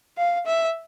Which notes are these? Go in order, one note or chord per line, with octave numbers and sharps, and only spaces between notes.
F5
E5